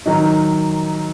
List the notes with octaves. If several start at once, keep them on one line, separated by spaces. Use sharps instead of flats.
D#3 F#3 D#4